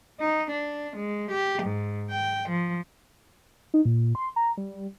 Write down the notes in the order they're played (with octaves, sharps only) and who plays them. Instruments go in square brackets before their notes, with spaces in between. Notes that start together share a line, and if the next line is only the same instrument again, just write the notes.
[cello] D#4
D4
G#3
G4
G#2
G5
F3
[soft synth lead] D#4
A#2
C6
A#5
G3